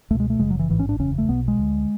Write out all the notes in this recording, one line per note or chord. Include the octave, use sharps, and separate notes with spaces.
C#2 B2 A3
G#3
A3
F#1 F#2 C#3 G#3
F#3
E3
A1 G#2 E3
C#4
D4
F#1 E2 C#3 C#4
A3
B1 B2 B3
G#3
D2 D3